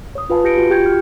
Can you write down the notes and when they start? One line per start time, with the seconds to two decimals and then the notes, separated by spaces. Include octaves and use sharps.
0.15 C#5 D#6
0.30 F4 B4 F5 G#5 A5
0.44 G4 G6 A#6 C#7 D7
0.57 F4 F#4
0.70 F4 G4 G5 G6 G#6 C#7
0.86 F6 G6